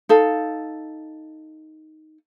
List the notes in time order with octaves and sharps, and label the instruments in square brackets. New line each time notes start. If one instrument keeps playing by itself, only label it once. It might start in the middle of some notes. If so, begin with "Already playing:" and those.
[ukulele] D#4 A4 F5